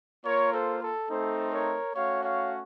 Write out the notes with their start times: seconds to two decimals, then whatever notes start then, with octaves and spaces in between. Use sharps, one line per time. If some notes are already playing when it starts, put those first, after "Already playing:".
0.25 A#3 F4 A#4 C#5
0.53 A4 C5
0.82 A4
1.10 A3 C4 D#4 A4 C5
1.52 A#4 C#5
1.95 A3 C#4 F#4 C#5 F5
2.24 C#5 F5